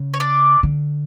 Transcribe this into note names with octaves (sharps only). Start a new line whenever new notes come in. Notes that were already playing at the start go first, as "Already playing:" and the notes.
Already playing: C#3
C#5
D4 D5
D3